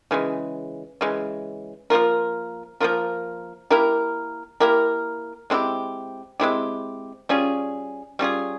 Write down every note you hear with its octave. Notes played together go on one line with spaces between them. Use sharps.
C#3 E3 G#3
C#3 E3 G#3
F3 A#3 F4 A#4
F3 A#3 F4 A#4
A#3 E4 G4 A#4
A#3 E4 G4 A#4
G#3 C4 E4 G4
G#3 C4 E4 G4
G3 C#4 F4 G#4
G3 C#4 F4 G#4